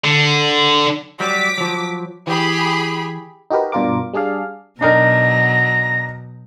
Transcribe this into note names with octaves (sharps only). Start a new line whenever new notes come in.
D3
F#3 G3 D6 B6
F3 F#3
E3 G4 G#4 B5
D#4 F#4 G4 A#4 B4
G2 B2 D4 F4 A#4 D6
G3 D4 G#4 D5 F5
B2 F#3 D4 D#4 A#4 A#5